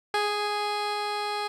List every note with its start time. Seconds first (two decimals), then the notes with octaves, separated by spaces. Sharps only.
0.14 G#4 G#5